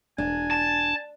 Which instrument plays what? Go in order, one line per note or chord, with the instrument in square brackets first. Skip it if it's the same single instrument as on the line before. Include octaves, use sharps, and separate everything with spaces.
[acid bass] E1 [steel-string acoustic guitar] D4 [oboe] G#5
[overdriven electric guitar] A5